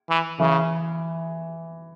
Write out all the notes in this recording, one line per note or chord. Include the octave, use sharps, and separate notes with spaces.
E3
C#3 E3